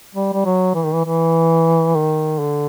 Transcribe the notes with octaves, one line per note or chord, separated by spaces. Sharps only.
G3
G3
F#3
E3
D#3
E3
E3
D#3
D3